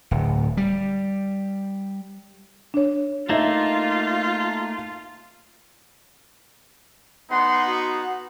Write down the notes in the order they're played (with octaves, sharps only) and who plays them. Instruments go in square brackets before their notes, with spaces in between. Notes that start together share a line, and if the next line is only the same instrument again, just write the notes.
[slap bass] D1
G3
[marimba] D4 C#5
[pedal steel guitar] A3 A#3 [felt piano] D#4 E5 [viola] F4
[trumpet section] B3 D#4 F#5 [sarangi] C6
[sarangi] F#4